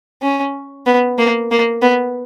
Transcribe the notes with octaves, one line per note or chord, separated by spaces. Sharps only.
C#4
B3
A#3
A#3
B3